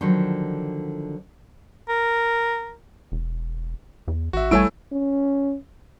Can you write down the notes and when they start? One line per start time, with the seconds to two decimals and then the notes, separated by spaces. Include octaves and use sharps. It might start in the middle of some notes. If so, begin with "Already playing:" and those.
0.01 D3 D#3 F3 F#3
1.89 A#4
3.12 E1
4.08 E2
4.33 A1 F#4 E5
4.51 G3 A3 E4 C#5 G#5 E6 D7
4.92 C#4